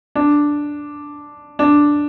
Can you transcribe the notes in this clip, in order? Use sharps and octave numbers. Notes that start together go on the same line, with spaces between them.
D4
D4